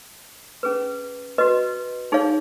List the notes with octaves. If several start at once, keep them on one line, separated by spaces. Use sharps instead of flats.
C#4 G#4 B4
F#4 B4 D#5
D#4 G#4 C#5 F5